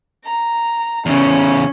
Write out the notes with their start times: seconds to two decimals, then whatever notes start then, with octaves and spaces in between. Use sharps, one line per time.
0.25 A#5
1.06 E2 C#3 C#4